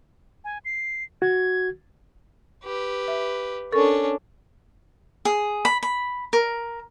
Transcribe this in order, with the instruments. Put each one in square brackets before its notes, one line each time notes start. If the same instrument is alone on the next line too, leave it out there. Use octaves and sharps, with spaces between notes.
[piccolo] G#5
C7
[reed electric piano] F#4 [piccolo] G#6
[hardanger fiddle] G4 B4
[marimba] E5
[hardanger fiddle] C#4 D4 [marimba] A4 A#4 C#6
[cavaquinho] G#4
B5
B5
A#4